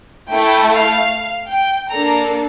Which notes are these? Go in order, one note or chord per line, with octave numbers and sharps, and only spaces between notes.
A3 E4 A4 G5
F5
G5
A#3 D4 A4 A#5